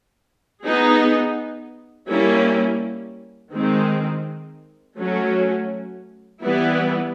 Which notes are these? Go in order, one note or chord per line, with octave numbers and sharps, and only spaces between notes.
B3 D#4 G#4
G3 A#3 C#4 E4
D#3 G#3 C4
F#3 A3 C#4
E3 G3 B3 E4